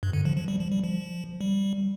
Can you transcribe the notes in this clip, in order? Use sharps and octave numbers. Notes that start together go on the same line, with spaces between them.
G2
D3
F3
F3
G3
F3
G3
F3
G3